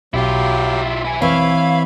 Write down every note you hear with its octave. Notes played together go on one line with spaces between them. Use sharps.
B1 F#3 E4 F4 G4
E4 G#5
E3 C4 C#5 E5 F5 B5